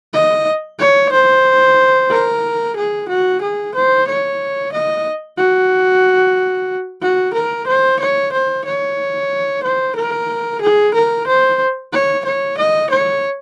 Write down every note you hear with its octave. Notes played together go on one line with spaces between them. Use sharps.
D#5
C#5
C5
A#4
G#4
F#4
G#4
C5
C#5
D#5
F#4
F#4
A#4
C5
C#5
C5
C#5
C5
A#4
G#4
A#4
C5
C#5
C#5
D#5
C#5